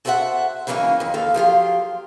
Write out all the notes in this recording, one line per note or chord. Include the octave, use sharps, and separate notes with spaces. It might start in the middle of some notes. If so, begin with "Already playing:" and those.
F#4 A4 C5 D5 E5 F#5
C#3 E3 F#3 A#3 C#4 D#4
F2 D#3
D#2 A4 F5
F3 F#3 F4 G4